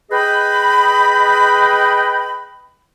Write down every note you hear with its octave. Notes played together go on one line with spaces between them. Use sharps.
G#4 B4 D#5 G5 B5